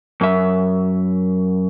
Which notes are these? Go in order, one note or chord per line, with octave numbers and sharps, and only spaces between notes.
F#2 E5